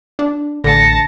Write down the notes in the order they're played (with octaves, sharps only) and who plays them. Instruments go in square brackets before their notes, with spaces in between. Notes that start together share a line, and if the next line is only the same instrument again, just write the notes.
[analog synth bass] D4
[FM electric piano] A1 C#7 [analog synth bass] D3 [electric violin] A5 A#6